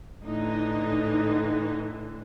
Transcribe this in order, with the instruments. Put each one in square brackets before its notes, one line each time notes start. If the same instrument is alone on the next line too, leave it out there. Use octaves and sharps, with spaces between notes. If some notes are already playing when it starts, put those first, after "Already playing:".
[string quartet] A2 D3 E3 [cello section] D#4